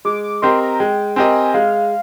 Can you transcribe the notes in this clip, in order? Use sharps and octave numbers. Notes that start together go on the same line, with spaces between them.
G#3 D6
D6
C4 G4 A#4 D#5 C6
A#5
G#3 G5
C4 G4 A#4 D#5 G#5
G#3 F5